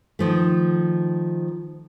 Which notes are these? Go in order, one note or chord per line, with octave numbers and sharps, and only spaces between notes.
D#3 F3 A3